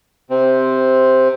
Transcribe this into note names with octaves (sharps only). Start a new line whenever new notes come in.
C3 C4